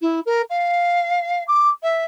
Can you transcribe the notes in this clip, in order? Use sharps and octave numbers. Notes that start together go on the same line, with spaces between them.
E4
A#4
F5
D6
E5